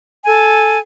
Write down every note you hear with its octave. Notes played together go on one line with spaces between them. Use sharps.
A4 G#5